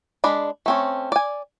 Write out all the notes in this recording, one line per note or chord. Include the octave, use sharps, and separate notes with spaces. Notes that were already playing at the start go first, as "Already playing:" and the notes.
G#3 D4 D5 B5
A3 C4 C#4
D5 G#5